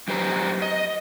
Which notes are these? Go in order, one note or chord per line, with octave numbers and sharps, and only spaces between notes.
F#2 F#3 G4 B4 C5 A#5
D#5